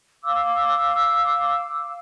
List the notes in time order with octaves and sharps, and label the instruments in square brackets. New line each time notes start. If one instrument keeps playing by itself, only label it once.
[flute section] F5 D6 E6